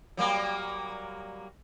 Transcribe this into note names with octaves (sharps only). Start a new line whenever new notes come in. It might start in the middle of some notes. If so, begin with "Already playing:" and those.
F#3 G3 A#3